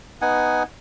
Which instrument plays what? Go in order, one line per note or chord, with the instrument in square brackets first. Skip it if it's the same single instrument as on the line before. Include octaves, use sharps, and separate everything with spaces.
[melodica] B3 D#4 F#5 G#5